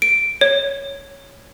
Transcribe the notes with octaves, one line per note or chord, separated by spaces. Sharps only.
D7
C#5